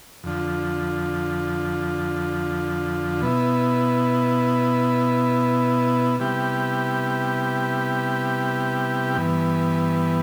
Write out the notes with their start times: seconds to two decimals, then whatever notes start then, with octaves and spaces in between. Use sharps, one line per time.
0.23 F2 D3 F3
3.21 B2 B3 E4
6.19 C3 G3 B3 E4 G4
9.16 G2 E3 B3